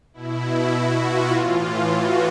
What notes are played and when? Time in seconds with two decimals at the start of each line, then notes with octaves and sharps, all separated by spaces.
0.13 B2 E4
0.73 F#4
1.03 F4
1.31 A2 E3 F4
1.91 F#4